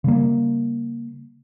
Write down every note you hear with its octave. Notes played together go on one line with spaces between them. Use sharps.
C#3 G3 A#3